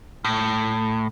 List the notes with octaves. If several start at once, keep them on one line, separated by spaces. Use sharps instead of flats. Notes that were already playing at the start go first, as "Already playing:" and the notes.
A2